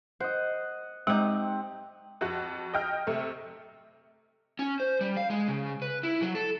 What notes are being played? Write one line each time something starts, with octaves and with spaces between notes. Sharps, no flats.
C5 D#5 F#5
G#3 C4 D#4 G4 F#5
F2 F#4
D#5 G5 F6
C3 A3
C#4
C5
G3
F5
G#3
C#3
B4
E4
F#3
A4